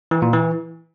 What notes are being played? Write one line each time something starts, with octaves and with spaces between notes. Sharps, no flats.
E3
A#2
E3